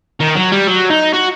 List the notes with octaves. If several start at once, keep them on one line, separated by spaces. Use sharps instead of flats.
D#3
F#3
G3
F#3
D#4
F#4